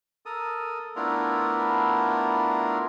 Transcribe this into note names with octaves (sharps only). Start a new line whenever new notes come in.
A4 A#4 D#6
A3 B3 D4 E4 F4 A#4